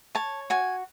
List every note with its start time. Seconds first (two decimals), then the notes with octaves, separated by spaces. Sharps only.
0.15 C#5 A5
0.50 F#4 G#5